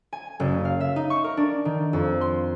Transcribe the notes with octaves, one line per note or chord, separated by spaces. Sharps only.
G#5
F#1
F5
E5
D#4
C#6
A#4
D4
D#3
F2
C6